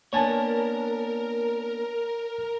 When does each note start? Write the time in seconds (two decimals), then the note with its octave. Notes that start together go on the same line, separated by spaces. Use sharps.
0.13 A#3 B3 D4 A#4 C#5 G#5 A5